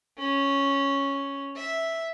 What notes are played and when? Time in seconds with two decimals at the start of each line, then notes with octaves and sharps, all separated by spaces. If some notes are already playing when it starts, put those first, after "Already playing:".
0.18 C#4
1.56 E5